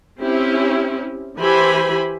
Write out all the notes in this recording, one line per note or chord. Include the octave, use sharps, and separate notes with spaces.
C4 C#4 E4 G4
E3 E4 G4 C5 G#5 B5